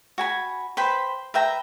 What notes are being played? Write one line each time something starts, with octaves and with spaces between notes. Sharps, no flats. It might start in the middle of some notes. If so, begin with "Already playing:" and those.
F#4 G#5 B5
B4 C5 G5 B5
B4 E5 G5 A#5